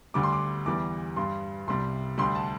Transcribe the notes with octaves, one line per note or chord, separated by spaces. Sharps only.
D2 D3 G3 D6
C6
D6
E2 E3 G3 D6
G2 G3 C6
C2 C3 G3 C6
D2 D3 G3 C6
A5